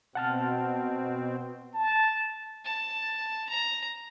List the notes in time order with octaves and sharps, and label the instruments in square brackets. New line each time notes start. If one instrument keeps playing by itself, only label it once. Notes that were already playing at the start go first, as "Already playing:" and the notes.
[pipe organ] B2 C4 [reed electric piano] F#5 A5 F6
[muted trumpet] A5
[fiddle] A5
A#5